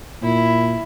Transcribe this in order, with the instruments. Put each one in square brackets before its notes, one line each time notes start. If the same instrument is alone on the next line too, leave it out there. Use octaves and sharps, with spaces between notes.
[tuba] A#2 [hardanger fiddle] E4